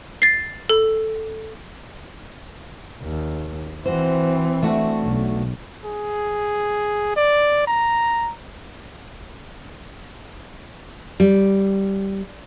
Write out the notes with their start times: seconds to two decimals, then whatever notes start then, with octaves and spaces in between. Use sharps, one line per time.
0.22 A6 C7
0.69 A4
3.02 D#2
3.86 E3 C4 F#4 C5
4.62 A3 D4 F#4
5.03 B1
5.85 G#4
7.16 D5
7.67 A#5
11.20 G3